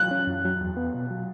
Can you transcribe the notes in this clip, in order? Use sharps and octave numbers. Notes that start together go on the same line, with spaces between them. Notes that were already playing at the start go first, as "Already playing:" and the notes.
Already playing: F#3 F#6
C#4
F#2
F#3
E2
B3
B2
F#3